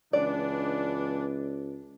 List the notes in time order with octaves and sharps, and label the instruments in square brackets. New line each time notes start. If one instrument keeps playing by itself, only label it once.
[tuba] C#2 [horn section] E3 B3 D4 [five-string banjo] D5